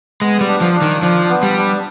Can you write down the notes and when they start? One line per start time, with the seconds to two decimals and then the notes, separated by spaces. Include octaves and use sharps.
0.22 G#3 B3
0.41 G3
0.48 D4
0.61 F3
0.75 D4
0.82 D#3
1.02 F3 D4
1.30 B3
1.43 G3
1.57 D4